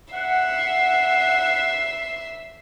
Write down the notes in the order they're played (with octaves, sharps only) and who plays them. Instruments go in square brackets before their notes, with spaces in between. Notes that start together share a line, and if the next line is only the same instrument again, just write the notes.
[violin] E5 C7 [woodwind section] F#5